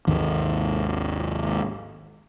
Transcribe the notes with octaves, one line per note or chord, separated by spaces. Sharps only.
G#1 D#2